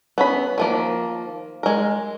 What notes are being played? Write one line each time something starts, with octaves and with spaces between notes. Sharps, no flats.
B3 C#4 B5
D#3 F3 A#3
G#3 A#4